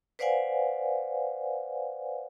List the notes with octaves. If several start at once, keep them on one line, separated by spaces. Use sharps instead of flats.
B4 C5 D5 F5 F#5 G#5